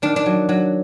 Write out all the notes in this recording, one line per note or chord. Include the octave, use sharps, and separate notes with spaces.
D#3 D4
D4
F#3
F#3